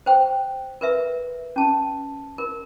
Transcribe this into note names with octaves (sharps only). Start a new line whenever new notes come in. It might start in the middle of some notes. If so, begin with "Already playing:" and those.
C5 G5
A#4 B4 E5
C#4 A5
A#4